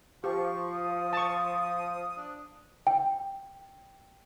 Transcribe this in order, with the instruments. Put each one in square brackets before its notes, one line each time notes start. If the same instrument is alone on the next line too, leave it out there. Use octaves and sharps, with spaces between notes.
[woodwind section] F3 [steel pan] G4 [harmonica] C#6
[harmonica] D#6
[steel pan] A5 C#6
[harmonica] D4
[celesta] G5